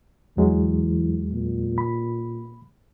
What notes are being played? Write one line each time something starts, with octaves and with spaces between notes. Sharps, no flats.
E2 E3 F#3 G#3
A#2
B5